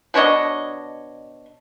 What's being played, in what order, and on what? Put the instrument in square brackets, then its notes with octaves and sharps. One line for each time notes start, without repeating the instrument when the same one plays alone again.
[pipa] B2 D4 C#5 D#5